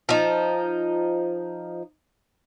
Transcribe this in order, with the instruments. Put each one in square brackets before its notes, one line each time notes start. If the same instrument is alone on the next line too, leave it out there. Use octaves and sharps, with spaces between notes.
[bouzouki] F3 D#4